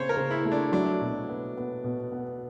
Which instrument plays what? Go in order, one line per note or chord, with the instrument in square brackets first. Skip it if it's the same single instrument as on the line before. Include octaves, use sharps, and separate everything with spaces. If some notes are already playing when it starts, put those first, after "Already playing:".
Already playing: [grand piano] C#3 C4 [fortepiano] C5 C#5
[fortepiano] A#4
[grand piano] C#3
[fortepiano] E4
[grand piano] A3
[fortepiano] D4
[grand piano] F#3 [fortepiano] D4
[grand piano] B2
B3
B3
B2
B3